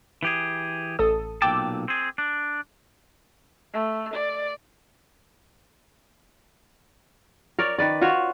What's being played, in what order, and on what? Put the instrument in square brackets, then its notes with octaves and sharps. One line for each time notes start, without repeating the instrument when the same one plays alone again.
[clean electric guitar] E3 G4 G#4
[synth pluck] A1 A4 D#6
[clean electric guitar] B1 A#2 A5 [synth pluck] G5 D6 E6
[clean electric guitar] C4 G#4
D4
[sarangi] A3
D5
[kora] A#4 C#5 D5
D#3 B4 D5
F4 F#4 C#5